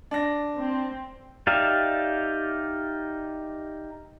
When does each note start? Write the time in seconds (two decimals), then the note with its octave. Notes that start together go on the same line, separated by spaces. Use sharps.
0.11 D4 A#6
0.57 C4
1.47 D#4 G4 D5 E5 F5